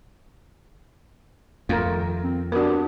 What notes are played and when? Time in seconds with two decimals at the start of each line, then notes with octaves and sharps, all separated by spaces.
1.69 F2 A3 F4 A#4
1.90 D#3
2.24 C4
2.52 B3 D4 F#4 G4 A#4